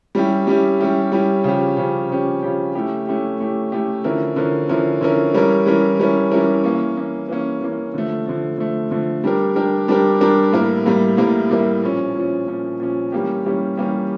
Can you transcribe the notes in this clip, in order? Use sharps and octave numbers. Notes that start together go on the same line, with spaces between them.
G3 C#4 E4 G4
G3 C#4 E4 G4
G3 C#4 E4 G4
G3 C#4 E4 G4
C#3 F3 C#4 G4
C#3 F3 C#4 G4
C#3 F3 C#4 G4
C#3 F3 C#4 G4
A3 C#4 E4 G4
A3 C#4 E4 G4
A3 C#4 E4 G4
A3 C#4 E4 G4
D3 F3 C#4 E4 A#4
D3 F3 C#4 E4 A#4
D3 F3 C#4 E4 A#4
D3 F3 C#4 E4 A#4
E3 G3 C#4 E4 A#4
E3 G3 C#4 E4 A#4
E3 G3 C#4 E4 A#4
E3 G3 C#4 E4 A#4
E3 A#3 C#4
E3 A#3 C#4
E3 A#3 C#4
E3 A#3 C#4
D3 F3 A3
D3 F3 A3
D3 F3 A3
D3 F3 A3
G3 D4 G4 A#4
G3 D4 G4 A#4
G3 D4 G4 A#4
G3 D4 G4 A#4
A2 G3 A#3 E4 A#4
A2 G3 A#3 E4 A#4
A2 G3 A#3 E4 A#4
A2 G3 A#3 E4 A#4
A#2 F3 C#4
A#2 F3 C#4
A#2 F3 C#4
A#2 F3 C#4
E3 G3 A#3 C#4 G4
E3 G3 A#3 C#4 G4
E3 G3 A#3 C#4 G4